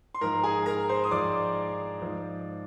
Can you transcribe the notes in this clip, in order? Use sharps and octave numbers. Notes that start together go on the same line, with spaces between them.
C6
G#2 F3 A#4 A#5
G#4 G#5
A#4 A#5
C5 C6
D#6
G#2 F3 D5 D6
G#2 F3